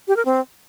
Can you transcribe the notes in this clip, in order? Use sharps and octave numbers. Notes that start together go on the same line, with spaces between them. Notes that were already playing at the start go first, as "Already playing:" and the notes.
G4
A#4
C4